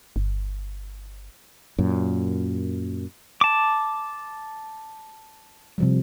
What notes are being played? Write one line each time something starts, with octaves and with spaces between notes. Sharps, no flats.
G1
F#2 A#2
A5 D6
C3 F3 G3